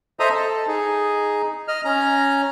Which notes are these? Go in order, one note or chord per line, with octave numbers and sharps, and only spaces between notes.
A4 C5 D#5 E5 A#5 D#6
A4
D#4 G#4
D#5 F6
C#4 A#5